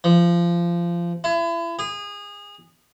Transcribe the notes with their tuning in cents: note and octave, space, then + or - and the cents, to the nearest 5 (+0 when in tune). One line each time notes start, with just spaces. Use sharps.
F3 -20
E4 +35
G#4 -25